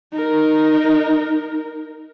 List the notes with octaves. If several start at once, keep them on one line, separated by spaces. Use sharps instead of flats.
D#4 A#4